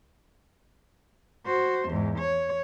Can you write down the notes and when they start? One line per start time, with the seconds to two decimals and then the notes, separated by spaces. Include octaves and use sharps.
1.46 F#4 C5
1.89 E2 G#2
2.19 C#5